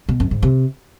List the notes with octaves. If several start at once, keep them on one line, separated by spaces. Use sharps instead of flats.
B2
F#2
G#2
C3